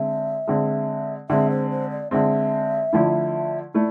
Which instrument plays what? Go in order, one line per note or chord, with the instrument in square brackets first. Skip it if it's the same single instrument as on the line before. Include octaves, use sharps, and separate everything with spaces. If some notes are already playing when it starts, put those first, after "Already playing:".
Already playing: [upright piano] D3 G#3 C4 [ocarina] E5
[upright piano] D3 G#3 C4
[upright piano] D3 G#3 C4 [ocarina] E5
[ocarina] C5
C5
D5
[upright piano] D3 G#3 C4 [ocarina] E5
[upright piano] D3 F3 A3 E4
[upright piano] A3 E4 [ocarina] D5